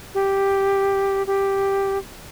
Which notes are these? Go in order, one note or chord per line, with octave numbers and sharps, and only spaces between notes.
G4
G4